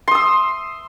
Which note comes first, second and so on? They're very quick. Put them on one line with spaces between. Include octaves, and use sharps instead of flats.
C6 D#6 E6